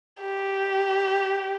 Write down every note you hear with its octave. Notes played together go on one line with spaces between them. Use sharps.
G4